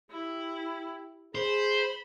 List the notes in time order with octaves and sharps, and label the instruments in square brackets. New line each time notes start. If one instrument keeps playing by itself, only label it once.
[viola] E4 [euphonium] G4
[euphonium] G#4 [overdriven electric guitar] C5 [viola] B5